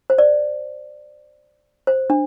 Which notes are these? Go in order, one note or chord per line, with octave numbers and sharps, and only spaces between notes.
C5
D5
C5
D4